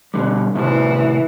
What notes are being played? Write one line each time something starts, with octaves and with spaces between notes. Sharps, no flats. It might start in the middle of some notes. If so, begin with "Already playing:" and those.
B2 D3 G3
A2 C3 E3